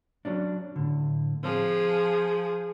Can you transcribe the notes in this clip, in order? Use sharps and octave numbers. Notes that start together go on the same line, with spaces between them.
F#3 C#4 D4
A2 D3
F3 C4 G#4